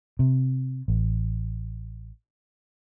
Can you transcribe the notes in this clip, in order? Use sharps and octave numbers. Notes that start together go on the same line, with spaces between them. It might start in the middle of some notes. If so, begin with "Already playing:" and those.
C3
A1